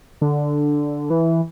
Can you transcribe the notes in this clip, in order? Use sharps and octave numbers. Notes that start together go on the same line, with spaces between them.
D3
E3